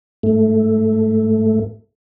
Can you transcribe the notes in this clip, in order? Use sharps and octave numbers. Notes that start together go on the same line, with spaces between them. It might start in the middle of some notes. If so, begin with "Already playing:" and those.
G#2 A3